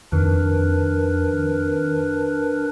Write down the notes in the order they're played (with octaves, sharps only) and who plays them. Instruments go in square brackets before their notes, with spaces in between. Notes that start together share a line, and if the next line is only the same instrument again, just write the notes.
[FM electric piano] F2 D#3 [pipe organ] D4 A#4 B4